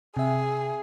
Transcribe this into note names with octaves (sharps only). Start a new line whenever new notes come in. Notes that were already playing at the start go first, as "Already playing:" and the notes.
C3 G#4 E5